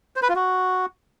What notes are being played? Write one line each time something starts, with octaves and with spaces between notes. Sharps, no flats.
C5
B4
F4
F#4